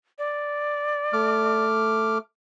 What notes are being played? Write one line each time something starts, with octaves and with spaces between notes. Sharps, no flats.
D5
A3 D6 F6